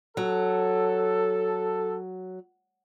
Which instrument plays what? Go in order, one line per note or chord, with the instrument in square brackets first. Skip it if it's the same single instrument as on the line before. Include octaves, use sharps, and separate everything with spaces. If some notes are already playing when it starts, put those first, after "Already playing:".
[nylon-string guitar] F#3 [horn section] A4